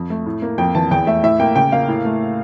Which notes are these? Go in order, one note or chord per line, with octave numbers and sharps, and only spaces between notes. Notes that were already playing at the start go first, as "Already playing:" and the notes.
Already playing: F2
A3
A2
A#3
F2 G5
E3 A5
E2 G5
A3 E5
A2 E5
A#3 G5
C#3 G5
A#3 F5
A2
A3